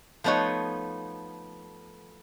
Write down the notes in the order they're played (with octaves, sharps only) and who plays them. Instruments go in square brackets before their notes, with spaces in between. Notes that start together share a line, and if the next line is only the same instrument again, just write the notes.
[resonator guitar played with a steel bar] F3 A3 B3 D#4 C#5